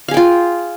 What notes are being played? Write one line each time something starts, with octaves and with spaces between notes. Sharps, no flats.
F4 G#4 F5 G5